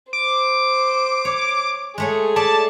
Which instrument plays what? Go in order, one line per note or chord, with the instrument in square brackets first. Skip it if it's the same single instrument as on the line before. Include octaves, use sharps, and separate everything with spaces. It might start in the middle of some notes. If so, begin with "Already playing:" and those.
[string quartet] C5 [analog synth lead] D6
[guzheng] C#5
[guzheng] G#3 A3 C#5 [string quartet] G#4
[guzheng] A4 D5 E5 [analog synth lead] A5